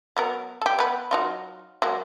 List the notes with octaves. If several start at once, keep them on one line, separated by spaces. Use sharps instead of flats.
F#3 B3 A#4
G4 A4
B3 B4
F#3 D#4 F4
F#3 G#3 A#3